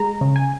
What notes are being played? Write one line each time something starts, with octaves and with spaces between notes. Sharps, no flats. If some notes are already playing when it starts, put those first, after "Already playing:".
Already playing: G#3 A#5
C#3
G#5